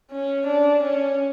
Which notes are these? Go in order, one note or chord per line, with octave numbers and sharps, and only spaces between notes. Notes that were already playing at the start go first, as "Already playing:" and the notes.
C#4
D4
C#4